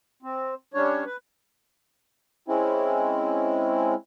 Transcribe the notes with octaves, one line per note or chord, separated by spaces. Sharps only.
C4
G3 C#4 D4 C#5
B4
G#3 C4 C#4 E4